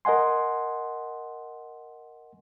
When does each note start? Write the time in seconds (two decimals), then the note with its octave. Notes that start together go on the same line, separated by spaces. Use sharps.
0.05 A#4 D#5 F#5 G#5 C6